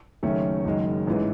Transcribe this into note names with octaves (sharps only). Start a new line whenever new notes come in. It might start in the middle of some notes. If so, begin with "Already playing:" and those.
F#1 F#2 D#3 A3 C#4
F#1 F#2 D#3 G#3
A1 G#2 E3 G#3